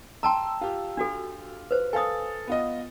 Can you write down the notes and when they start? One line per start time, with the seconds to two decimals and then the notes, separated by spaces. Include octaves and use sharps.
0.23 G5 A5 A#5 C6 E6
0.61 F4 G4
0.97 D4 F#4 A4
1.71 B4 C5
1.93 A4 F5 G#5 D#6 A6
2.47 B3 F4 D#5